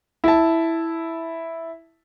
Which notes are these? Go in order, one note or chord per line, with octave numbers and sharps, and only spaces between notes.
E4 A5